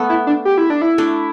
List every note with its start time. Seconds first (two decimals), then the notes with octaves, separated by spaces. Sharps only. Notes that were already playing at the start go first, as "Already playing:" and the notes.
Already playing: A3 B3
0.09 E4
0.27 D4
0.45 G4
0.58 E4
0.70 D4
0.82 E4
0.98 A3 D4